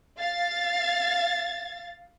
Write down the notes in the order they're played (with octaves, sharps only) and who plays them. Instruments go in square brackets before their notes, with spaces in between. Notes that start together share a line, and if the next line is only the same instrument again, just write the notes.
[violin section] F5 A6